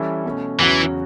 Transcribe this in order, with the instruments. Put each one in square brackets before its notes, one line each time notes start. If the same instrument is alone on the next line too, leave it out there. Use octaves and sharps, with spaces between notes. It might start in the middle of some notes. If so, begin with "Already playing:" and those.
Already playing: [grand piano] E3 G3 C#4 E4 A4
B2 A3 C#4
[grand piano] E2 C#3 F#3 C#4 F#4 [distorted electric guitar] E3